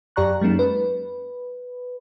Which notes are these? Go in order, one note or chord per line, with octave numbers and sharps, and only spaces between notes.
F#2 G4 D5 A#5 C#6 F#6
F#3 G#3 A#3 C#4 D#4
B4